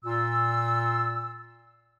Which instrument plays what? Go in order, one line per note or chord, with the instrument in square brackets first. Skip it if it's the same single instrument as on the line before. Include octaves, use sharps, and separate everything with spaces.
[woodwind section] A#2 F4 E6